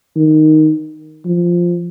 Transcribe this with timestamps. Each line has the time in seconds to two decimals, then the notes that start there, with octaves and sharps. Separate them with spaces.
0.16 D#3
1.25 F3